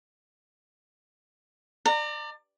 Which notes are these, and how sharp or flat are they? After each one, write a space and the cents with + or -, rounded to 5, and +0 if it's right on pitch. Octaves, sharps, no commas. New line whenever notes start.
D5 +25 A#5 -30